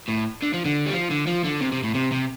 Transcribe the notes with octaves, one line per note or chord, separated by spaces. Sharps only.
A2
D3
F3
D3
G3
F3
D3
F3
D3
C3
C3
A2
C3
C3